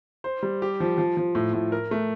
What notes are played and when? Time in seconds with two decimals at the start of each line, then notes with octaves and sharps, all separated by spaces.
0.24 C5
0.43 G3
0.62 G4
0.80 F3
0.98 F3
1.17 F3
1.35 A2
1.53 A2
1.72 A#4
1.91 A3